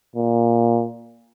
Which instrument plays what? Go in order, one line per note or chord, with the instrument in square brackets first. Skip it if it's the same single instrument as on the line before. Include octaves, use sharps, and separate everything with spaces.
[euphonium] A#2